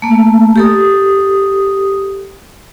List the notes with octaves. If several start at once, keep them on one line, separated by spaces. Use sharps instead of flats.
A3 A#3
G4 A4 D#6